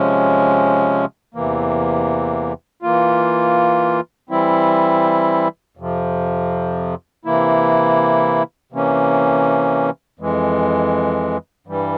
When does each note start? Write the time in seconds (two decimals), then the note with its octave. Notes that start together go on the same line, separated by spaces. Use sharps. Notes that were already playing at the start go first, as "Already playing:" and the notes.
Already playing: C3 F3 G#3 C#4
1.35 E2 C3 E3 A#3
2.83 E3 A#3 F4
4.30 E3 G3 C4 E4
5.77 F2 C3 F3
7.25 C3 E3 A#3 E4
8.72 C3 E3 A#3 C#4
10.19 F2 E3 G#3
11.67 G2 E3 G3